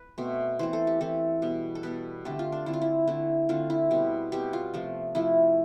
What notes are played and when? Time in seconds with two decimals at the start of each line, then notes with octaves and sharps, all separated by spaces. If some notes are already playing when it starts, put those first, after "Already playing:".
Already playing: B4
0.18 B2 A3 C4
0.59 E3 A3 C4 C5
0.73 A4
0.87 G4
1.01 E3 A3 C4 A4
1.42 B2 G3 B3
1.75 A4
1.83 B2 G3 B3 B4
2.25 D3 A3 C4 G4
2.39 F4
2.52 D4
2.66 D3 A3 C4 E4
2.73 F4
2.82 E4
3.08 D3 A3 C4 E4
3.49 D3 A3 C4 F4
3.70 E4
3.91 B2 G3 C4
4.32 B2 G3 C4 G4
4.53 F4
4.74 C3 F3 A3
5.15 C3 F3 A3 E4